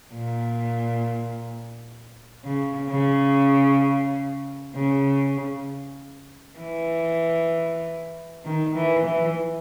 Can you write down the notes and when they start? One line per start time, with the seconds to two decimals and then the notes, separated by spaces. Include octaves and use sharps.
0.14 A#2
2.44 C#3
2.90 C#3
4.75 C#3
6.60 E3
8.45 D#3
8.75 E3
9.06 E3